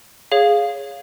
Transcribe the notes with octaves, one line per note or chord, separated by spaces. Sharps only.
G#4 C#5 F5